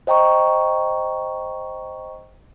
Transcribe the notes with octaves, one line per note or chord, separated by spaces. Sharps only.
C5 D#5 G5 A#5 C#6